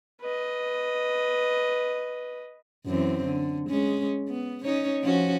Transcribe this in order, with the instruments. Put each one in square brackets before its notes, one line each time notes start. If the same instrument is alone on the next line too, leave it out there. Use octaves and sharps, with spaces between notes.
[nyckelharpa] B4 D#5
[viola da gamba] F#2 E3 C4
D3
G#3 C#4
B3
C#4 D#4 C#5
F3 C#4 F#4